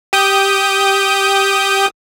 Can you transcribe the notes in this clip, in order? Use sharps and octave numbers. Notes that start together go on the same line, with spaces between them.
G4 D#6 G6